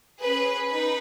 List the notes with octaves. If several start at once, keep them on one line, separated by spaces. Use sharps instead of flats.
C#4 G#4 B4
D#4 B4